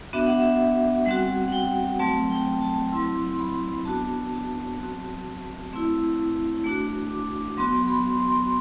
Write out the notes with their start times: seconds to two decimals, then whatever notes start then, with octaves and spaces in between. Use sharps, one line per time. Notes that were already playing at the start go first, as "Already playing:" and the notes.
0.13 B3 D4 F#4 E5
0.27 F#5
0.40 E5
1.06 G3 C4 F#4 F#5
1.48 F#5
1.52 G5
1.99 F#3 A3 C4 A5
2.30 G5
2.61 A5
2.92 F#3 C4 E4 C6
3.39 B5
3.85 B3 D4 F#4 A5
4.32 A5
4.78 F#3 C4 F#4
5.71 A3 C4 E4
6.64 A3 D4 F#4
7.10 D6
7.57 F#3 B3 F#4 C6
7.88 B5
8.20 C6